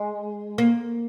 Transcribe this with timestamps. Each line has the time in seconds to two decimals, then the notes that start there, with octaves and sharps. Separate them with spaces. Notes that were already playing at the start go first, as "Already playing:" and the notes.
Already playing: G#3
0.58 A#3